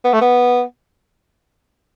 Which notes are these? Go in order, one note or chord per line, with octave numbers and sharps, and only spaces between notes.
B3
A3
B3